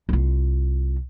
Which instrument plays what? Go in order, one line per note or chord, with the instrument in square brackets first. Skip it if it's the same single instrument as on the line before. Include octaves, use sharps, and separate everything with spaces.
[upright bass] C2 F4